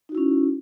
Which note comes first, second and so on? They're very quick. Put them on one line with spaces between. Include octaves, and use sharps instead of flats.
D#4 F#4 E4 C#4